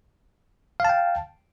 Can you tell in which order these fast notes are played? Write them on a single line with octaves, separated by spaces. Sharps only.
F5 A5 G5